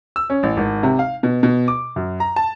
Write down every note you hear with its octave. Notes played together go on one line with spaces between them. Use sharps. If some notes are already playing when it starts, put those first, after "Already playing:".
E6
C#4
A1
G#1
C3
F5
B2
B2
D6
F#2
A#5
A5